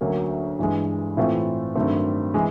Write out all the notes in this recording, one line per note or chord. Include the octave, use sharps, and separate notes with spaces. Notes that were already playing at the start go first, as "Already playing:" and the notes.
D2 D3 F#3 A#3 C#4
G2 E3 G#3
A2 E3 A3 C4 F4
G2 D#3 F#3 A3 C4
E3 G#3